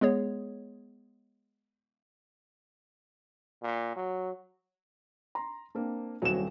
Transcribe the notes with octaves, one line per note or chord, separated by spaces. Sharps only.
G#3 B3 G#4 C#5
A#2
F#3
A#5 C6
A#3 C4 D4
D#1 C2 F#3 C4 E7